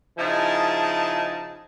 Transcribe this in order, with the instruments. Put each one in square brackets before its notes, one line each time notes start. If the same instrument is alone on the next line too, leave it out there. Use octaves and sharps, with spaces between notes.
[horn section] C#3 F3 D#4 E4 G#4 A5